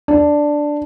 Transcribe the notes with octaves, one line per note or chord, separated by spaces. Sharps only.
D4